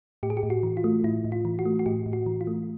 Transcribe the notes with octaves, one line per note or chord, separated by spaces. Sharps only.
A2 G4
G#4
G4
A2
F#4
E3
F4
A3
A2 E4
A2
F4
E3
F#4
A3
F#4
A2 G4
A2
F#4
E3
F4
A3